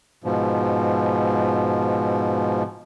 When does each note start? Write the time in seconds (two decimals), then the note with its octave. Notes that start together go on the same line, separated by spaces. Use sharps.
0.24 G#2 B2 F3